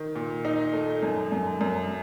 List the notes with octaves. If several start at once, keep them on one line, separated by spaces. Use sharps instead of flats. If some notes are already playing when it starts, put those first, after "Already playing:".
Already playing: D#3
A#2
D#4
A3
F#2
F#2
F#2